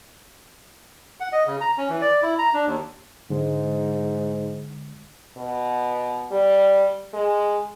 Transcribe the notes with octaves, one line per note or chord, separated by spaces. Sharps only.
F#5
D#5
C#3
A#5
C#4
E3
D5
E4
A#5
D4
D#2
G#2 D3 G#3
B2
G3
G#3